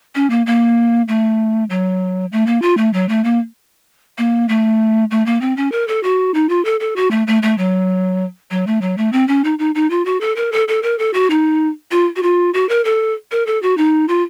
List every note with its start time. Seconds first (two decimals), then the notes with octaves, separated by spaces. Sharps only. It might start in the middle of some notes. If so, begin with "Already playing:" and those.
0.15 C#4
0.30 A#3
0.46 A#3
1.08 A3
1.70 F#3
2.32 A3
2.46 A#3
2.62 F4
2.77 A3
2.93 F#3
3.09 A3
3.24 A#3
4.18 A#3
4.49 A3
5.11 A3
5.26 A#3
5.41 C4
5.57 C#4
5.72 A#4
5.88 A4
6.03 F#4
6.34 D#4
6.49 F4
6.65 A4
6.80 A4
6.96 F#4
7.11 A3
7.27 A3
7.42 A3
7.58 F#3
8.51 F#3
8.67 A3
8.81 F#3
8.98 A3
9.12 C4
9.28 C#4
9.44 D#4
9.59 D#4
9.75 D#4
9.90 F4
10.05 F#4
10.21 A4
10.36 A#4
10.52 A4
10.68 A4
10.83 A#4
10.99 A4
11.13 F#4
11.30 D#4
11.91 F4
12.16 F#4
12.23 F4
12.54 F#4
12.69 A#4
12.85 A4
13.31 A#4
13.46 A4
13.62 F#4
13.77 D#4
14.08 F4